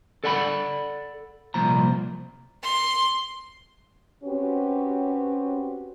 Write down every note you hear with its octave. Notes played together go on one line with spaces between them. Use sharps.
A4 D5 F#5 G#5 B5
C2 A#2 F3 A#5
C6
C4 C#4 F#4 G4 B4 C#5